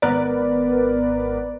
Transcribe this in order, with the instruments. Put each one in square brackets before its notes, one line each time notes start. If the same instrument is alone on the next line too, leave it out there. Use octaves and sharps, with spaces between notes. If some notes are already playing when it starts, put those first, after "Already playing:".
[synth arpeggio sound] G#1 B3 A#4 B4 D5